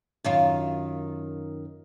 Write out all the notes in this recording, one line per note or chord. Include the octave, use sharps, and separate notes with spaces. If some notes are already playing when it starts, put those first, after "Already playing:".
F#2 D#3 F4